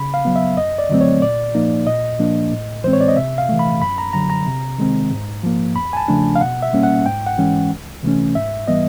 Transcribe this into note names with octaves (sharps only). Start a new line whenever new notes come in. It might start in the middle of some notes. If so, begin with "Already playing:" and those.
Already playing: C#3 B5
F5
F#3 B3
E5
F#2 D#5
D5
D3 F#3 A3 C4
C#5
A#2 D5
F3 A#3 D#4
A#2 D#5
F3 A#3 D4
A2
E3 G#3 C4 C5
C#5
D5
D#5
C3 E5
F5
E3 A3
B5
F#2 B5
A#5
D3 F#3 A#5
A#5
C3
D#3 G#3 C4
G#2
F3 A#3
E2 B5
G#5
A5
C#3 F3 A3 D4
F5
B2 F#5
E5
G3 A#3 C#4
F#5
G#2 G5
F#5
E3 G#3 C#4
C#2
C3 E3 A3 C#4
G#2 E5
E3 G3 B3 D#5